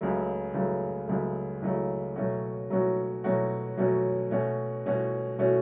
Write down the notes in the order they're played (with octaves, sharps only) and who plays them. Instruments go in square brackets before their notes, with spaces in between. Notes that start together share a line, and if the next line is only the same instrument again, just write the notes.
[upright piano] C#2 C#3 F#3 A3
C#2 C#3 F#3 A3
C#2 C#3 F#3 A3
C#2 C#3 F#3 A3
B2 F#3 A3 C#4 F#4
B2 F#3 A3 C#4 F#4
B2 F#3 A3 C#4 F#4
B2 F#3 A3 C#4 F#4
B2 A3 C#4 F#4
B2 A3 C#4 F#4
B2 A3 C#4 F#4